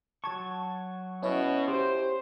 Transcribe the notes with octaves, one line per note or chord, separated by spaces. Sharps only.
F#3 A5 C#6 G#6
B2 C#4 E4 C#5
G4 C5